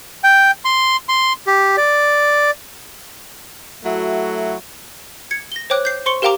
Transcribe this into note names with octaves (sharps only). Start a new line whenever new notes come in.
G5
C6
C6
G4
D5
F#3 A3 E4 F#4
G#6 C#7
A#6 G7
C5 C#5 G5 D6 F#6
G6 C7
C5 C6 C#6 C#7 G7
G4 A#4 F5 G5 A#5 D6